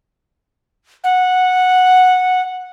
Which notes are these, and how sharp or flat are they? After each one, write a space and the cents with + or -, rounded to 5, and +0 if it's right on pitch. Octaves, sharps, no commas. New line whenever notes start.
F#5 -10